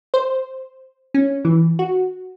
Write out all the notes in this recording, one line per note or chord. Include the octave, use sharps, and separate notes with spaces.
C5
C#4
E3
F#4